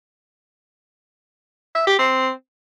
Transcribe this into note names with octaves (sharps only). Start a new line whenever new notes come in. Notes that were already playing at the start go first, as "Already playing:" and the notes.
E5
G4
C4